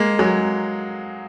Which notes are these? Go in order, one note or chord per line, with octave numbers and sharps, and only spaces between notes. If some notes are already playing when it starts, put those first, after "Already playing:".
Already playing: G#3 A#3
F#3 G#3